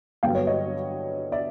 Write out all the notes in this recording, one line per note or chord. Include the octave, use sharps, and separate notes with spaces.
G2 D3 F#3 B3 F5 G5
B4 C#5
C#5 D#5
D5 E5